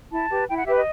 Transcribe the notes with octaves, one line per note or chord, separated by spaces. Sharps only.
E4 A5
G4 B4
E4 G5
F#5
G4 B4 E5
D#5